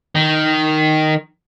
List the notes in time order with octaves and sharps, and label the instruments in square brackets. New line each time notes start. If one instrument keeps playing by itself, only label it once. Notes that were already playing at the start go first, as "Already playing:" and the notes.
[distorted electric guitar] D#3